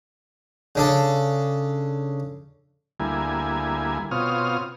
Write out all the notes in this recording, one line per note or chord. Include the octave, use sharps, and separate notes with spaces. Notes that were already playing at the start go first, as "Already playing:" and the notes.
C#3 D4 A4
D2 G3 A#3 E4 G#5
B2 C4 F4 C#5 D#6 F6